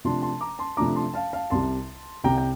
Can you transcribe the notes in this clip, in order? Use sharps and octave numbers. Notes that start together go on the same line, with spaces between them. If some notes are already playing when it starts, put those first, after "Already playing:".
C3 F3 A3 D4 A5 C6
A5 C6
A#5 D6
A5 C6
C3 F3 A3 D4 A#5 D6
A5 C6
F5 A5
F5 A5
C2 C3 G3 A5 C6
C2 C3 G3 G5 A#5
G5